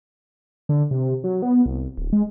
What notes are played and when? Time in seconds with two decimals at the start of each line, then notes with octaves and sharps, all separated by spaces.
0.69 D3
0.91 C3
1.24 F#3
1.42 B3
1.66 C2
1.98 D1
2.13 G#3